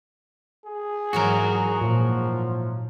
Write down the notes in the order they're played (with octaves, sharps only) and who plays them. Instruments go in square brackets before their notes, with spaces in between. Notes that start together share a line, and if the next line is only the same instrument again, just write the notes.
[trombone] G#4
[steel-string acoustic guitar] G#2 E3 F#3 [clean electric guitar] F#4 A#4
[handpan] A#2 [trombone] F3